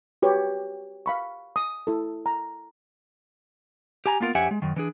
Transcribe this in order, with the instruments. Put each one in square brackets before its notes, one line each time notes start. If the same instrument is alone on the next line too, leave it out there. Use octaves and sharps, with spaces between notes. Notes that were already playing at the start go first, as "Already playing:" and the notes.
[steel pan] F#4 G4 B4 C#5
F5 B5 C#6
D#6
E4 A4
A#5
[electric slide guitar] G4 G#5 A#5
A#3 B3 F4 A#4
F2 C#4 G4 E5 F#5 G#5
G#3
F#2 D#3
E3 D4 G#4